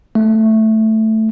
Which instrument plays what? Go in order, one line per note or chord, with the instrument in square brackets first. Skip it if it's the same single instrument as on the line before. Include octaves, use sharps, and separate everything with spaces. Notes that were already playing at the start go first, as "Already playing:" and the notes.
[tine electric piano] A3